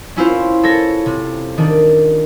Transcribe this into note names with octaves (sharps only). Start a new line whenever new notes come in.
C#4 E4 F4 C5
A4 C#5 A#6
C3
D#3 D4